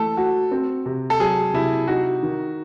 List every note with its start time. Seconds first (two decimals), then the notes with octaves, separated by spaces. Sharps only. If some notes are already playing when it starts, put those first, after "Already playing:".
Already playing: E3 A3 A4
0.17 F#4
0.51 C4
0.86 C3
1.10 A4
1.19 F#3 G#4
1.54 C3 E4
1.88 D#4 F#4
2.23 D#3